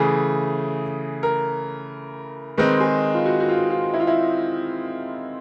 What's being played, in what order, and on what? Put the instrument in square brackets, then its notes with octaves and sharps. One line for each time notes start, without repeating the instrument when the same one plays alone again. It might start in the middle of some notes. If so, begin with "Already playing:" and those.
Already playing: [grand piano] C#3 E3 A3 [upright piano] G#4
[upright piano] A#4
[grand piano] D#3 G#3 C4 D#4 [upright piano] B4
[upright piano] G#4
F4
F#4
F#4
F4
F4
E4
F4
E4